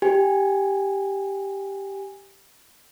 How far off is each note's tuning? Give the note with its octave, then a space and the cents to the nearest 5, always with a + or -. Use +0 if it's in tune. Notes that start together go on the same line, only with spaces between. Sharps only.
G4 +0 G#5 -15